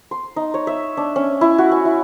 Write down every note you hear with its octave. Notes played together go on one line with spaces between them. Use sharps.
C6
D#4
C#5
E5
D4
C#4
E4
F#4
G#5
E4